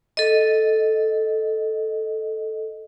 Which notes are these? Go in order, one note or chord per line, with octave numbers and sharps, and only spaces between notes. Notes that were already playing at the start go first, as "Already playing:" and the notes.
A4 D#5